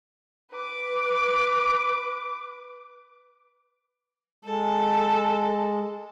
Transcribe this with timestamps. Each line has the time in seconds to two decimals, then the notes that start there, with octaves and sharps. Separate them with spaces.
0.52 B4 D6
4.45 G#3 A4